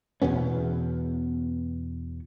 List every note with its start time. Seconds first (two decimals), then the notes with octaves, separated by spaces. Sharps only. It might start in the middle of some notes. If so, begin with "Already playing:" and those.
0.22 E2 B2 B3 C#4